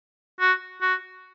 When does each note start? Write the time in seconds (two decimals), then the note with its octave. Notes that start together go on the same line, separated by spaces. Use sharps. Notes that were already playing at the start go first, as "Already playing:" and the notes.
0.40 F#4
0.82 F#4